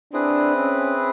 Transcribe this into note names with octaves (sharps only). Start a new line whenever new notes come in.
C4 D4 E4 G#4 B4
C#4